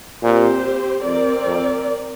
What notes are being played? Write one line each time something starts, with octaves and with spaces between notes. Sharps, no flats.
A#2 C4 G4 C5
F2 C4 A#4 D5
F2